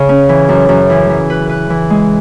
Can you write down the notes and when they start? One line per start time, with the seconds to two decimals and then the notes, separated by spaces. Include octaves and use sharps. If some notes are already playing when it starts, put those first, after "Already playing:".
Already playing: C#3
0.09 C#4
0.29 E3
0.49 F#2
0.69 F#2
0.90 E3
1.09 E3
1.30 B4
1.49 B4
1.70 E3
1.90 G#3